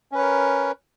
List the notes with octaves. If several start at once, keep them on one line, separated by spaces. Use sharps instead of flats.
C#4 A#4 B4 C#5